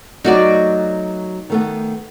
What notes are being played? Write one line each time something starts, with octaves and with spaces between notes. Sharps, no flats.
F#3 A3 D#4 F#4 D5
D#3 A3 B3